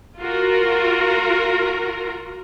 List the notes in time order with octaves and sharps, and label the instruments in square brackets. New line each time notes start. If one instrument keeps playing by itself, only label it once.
[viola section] F4 F#4 A#4